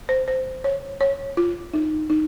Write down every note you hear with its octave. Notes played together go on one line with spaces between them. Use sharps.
C5
C5
C#5
C#5
F4
D#4
D#4